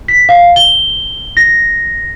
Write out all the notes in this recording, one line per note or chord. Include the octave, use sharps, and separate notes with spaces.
B6
F5
G7
A#6